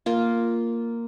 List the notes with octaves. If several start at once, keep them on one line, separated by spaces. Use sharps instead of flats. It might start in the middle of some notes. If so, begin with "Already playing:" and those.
A#3 F4